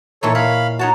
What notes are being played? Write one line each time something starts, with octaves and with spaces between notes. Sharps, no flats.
A#2 E3 D#4 A4 C#5
C#5 F5 B5
D#4 F#4 C#5 A5